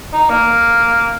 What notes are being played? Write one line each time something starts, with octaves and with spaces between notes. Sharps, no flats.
D#4
A#3